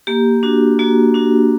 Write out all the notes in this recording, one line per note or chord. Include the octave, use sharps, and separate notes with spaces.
A#3 G4
D4 F#4
A#3 F#4
D4 F#4